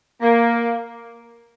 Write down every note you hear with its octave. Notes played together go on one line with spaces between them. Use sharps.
A#3